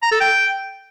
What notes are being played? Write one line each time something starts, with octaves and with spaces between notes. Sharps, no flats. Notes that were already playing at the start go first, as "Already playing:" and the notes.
A#5
A4
G5